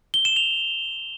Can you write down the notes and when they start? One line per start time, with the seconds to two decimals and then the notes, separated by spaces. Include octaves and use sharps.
0.14 G7
0.25 E7
0.36 F7